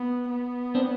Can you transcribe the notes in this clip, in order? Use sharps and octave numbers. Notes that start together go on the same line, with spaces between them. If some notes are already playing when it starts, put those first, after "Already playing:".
Already playing: B3
B3
C4 D4